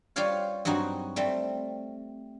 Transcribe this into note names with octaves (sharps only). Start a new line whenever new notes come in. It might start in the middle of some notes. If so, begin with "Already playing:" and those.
G3 F4 G4 C5 C#5 F5
G2 F#3 C4 D#4 F#4
G3 A3 C4